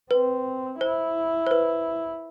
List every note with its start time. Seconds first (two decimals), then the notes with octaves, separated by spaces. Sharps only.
0.11 C4 B4
0.81 E4 C5
1.47 C5
1.51 B4